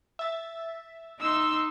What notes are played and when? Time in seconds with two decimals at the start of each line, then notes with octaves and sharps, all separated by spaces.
0.19 E5 A6
1.20 D#4 C6 E6